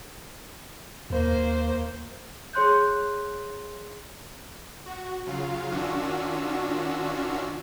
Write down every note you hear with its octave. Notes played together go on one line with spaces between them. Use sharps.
D#2 A#3 C5
G#4 C#5 C6 F#6 G6
F#4
C#3 F#3 F4 F5
D#3 C#4 D4 F4 F#4 E6